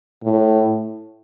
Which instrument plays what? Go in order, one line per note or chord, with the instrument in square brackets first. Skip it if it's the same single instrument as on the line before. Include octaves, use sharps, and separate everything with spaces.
[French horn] A2